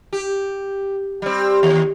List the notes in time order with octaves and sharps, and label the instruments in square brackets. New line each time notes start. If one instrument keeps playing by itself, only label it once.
[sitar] G4
G3 C4
D#2